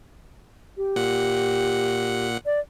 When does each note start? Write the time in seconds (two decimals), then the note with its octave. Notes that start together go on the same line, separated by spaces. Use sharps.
0.77 G4
0.96 A#2 F#5
2.46 D5